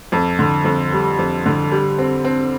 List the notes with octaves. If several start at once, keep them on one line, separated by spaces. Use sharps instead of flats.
F2
D3
F2
G3
F2
D3
G3
C4
C4